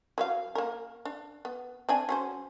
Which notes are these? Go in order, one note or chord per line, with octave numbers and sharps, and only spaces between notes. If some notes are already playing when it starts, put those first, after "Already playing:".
F#3 B4 F5
A#3 A#4
D4
B3
C4 D4 G#5
F#3 C#4 C5